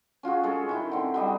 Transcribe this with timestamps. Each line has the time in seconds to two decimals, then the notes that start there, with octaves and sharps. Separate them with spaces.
0.23 C#4 F4 F#4 G#4
0.43 G#3 C#4 A4
0.69 D#3 E4 G5
0.91 D3 C4
1.14 F#3 G3 D#5